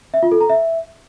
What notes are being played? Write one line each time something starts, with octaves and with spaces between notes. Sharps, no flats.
E5
F4
A4
A#5
E5